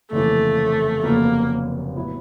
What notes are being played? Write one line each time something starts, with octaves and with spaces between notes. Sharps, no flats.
F1 D#2 C#3 E3 A3
F1 D#2 C#3 F#3 A#3 B3
A2 F#3 B3 E4